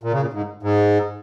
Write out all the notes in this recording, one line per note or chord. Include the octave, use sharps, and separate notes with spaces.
A#2
C#3
A#2
G#2
G#2